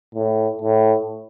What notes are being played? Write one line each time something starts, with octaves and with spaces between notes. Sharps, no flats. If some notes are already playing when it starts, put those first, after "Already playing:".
A2
A2